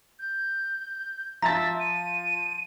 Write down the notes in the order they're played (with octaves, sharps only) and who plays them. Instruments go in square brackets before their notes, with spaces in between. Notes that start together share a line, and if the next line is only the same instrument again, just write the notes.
[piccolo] G6
[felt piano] F3 A6 [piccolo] E5 [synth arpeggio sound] A#5
[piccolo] D#7